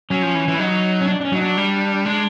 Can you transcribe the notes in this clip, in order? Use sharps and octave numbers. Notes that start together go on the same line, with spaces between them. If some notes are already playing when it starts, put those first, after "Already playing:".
F#3 C#4
F3
E3
E3
E4
F#3 D#4
C#4
D4
D4
C#4
F#3 D#4
D4
G3
G#3 D4